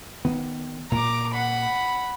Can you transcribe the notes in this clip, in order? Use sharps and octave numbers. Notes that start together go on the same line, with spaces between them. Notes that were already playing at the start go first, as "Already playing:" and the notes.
D#3 B3
A#2 A#5 D6
F#5 B5